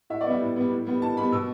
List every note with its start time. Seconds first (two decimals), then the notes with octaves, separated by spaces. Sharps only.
0.10 A2 E5
0.21 D5
0.26 G3 B3 E5
0.41 A2
0.56 G3 B3
0.72 A2
0.87 G3 B3
1.02 A2 A5
1.17 G3 B3 B5
1.32 B2 E6